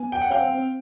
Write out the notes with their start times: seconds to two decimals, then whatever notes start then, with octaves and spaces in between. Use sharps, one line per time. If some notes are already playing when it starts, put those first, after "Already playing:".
Already playing: B3 G#5
0.12 G5
0.21 F#5
0.30 C#4 F5 G5
0.40 C4
0.55 C4